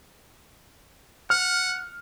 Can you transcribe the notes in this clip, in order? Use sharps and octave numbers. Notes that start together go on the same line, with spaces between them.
F#5 F6